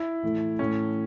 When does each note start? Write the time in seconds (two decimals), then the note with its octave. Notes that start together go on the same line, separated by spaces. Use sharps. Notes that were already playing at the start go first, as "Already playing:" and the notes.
Already playing: E4
0.23 A2 E3 A3
0.59 A2 E3 A3 C#4